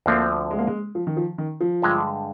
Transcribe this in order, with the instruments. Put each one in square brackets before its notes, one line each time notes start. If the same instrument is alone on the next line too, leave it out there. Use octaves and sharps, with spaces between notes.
[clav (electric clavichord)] D2 D3 F3 C4 [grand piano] A#3
[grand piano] G#3
A#3
G#3
F3
D#3
F3
D#3
F3
[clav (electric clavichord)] G2 D3 G#3